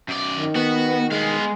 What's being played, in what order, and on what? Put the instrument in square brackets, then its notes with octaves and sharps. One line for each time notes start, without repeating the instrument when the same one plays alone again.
[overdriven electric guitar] F#2 D5
[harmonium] D#3
[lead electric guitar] B3 [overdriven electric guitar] F#4
[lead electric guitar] G#3 [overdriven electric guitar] B3 F5